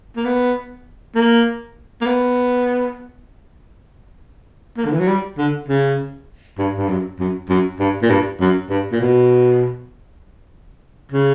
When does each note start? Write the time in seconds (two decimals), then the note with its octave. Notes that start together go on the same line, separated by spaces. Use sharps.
0.16 A#3
0.25 B3
1.15 A#3
2.01 A#3
2.06 B3
4.77 A#3
4.85 D3
4.93 E3
5.00 F#3
5.07 G3
5.37 D3
5.68 C#3
6.58 G2
6.78 G2
6.89 F#2
7.19 F#2
7.49 F#2
7.79 G2
8.02 A#2
8.10 G2
8.40 F#2
8.70 G2
8.92 A#2
9.01 B2
11.12 C#3